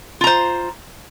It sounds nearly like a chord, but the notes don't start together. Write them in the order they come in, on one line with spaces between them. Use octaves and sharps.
F4 A#5 C5